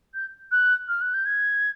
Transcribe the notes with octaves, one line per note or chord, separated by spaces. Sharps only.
G6
F#6
F6
F#6
G6
G#6